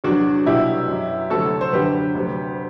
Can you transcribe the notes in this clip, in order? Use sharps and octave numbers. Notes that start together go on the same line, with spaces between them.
E2 C3 F#3 D4 F#4
C2 B2 F#3 E4 G4
F#2 F#3
D2 C3 F#3 F#4 A4
C5
F#2 D3 F#3 G4 B4
D2 C3 F#3